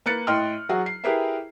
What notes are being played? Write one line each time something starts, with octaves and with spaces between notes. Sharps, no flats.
A#3 B4 F#6 A6 C#7
A2 D#5 G5 C6 F6
F#3 F#4 G#4
C7
E4 G4 G#4 A#4 B4 E5